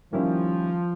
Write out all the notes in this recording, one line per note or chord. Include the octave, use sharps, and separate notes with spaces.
D#3 F3 G3 A#3 C#4 E4